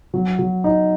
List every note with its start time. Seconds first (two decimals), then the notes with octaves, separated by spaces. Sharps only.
0.14 F#3
0.39 F#3
0.64 D#4